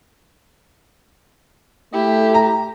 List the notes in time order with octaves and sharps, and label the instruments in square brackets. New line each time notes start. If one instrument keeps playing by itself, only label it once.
[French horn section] A3 [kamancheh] E4 G4
[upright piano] A#5